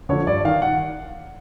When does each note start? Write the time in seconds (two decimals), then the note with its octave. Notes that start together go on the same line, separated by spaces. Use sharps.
0.09 D3 F3 C#5
0.27 G2 D5
0.45 D#3 F5
0.62 F#5